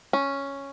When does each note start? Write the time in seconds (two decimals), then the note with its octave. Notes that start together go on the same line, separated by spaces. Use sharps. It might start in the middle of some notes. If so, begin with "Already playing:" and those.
0.13 C#4